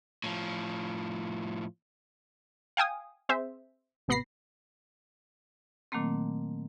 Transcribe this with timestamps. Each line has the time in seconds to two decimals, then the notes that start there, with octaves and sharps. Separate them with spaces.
0.24 A2 F3
2.77 F5 G5 G#5 D#6
3.29 C4 G#4 C5 E5
4.08 A1 C3 B3 B5 A#6 C7
5.92 A#2 D#3 F#3 A3 A#3 C4